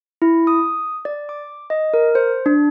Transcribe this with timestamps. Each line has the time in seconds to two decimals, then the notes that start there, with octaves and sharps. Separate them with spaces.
0.22 E4
0.47 D#6
1.05 D5
1.29 D6
1.70 D#5
1.94 A#4
2.15 C5
2.46 D4